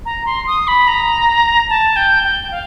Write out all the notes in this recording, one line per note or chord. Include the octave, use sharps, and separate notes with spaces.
A#5
C6
D#6
B5
A#5
A5
G5
G5
F5